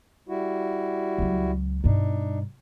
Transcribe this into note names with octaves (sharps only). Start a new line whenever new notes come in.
G3 E4 F#4
C#2 F#3
G2 B2 D4 D#4